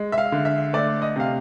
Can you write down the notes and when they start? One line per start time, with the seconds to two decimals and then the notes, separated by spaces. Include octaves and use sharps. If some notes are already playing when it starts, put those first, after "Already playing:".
Already playing: G#3
0.12 E5
0.18 F5
0.32 D3
0.45 E5
0.73 A3 D5
1.02 D#5
1.16 C3 F5